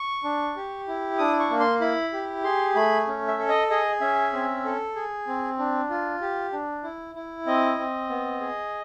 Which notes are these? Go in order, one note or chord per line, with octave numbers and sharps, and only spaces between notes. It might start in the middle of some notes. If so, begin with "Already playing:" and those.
Already playing: C#6
D4
G4
E4
D4 D#6
C#6
A#3
C6
E4 B5
G4
G#4 C6
A3 B5
C#4
E5
A4
D#5
G#4 D#5
C#4 E5
C4
A4
G#4
C4
D4
F4
G4
D4
E4
E4
C4 D#5
C4
B3
G#4